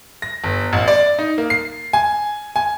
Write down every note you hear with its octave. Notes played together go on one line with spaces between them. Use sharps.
A#6
G1
A1
D5
D#4
A#3
C7
G#5
G#5